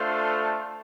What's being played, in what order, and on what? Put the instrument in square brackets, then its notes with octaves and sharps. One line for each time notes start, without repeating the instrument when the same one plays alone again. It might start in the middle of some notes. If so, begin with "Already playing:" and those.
Already playing: [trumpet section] A3 D4 F4 A4 C5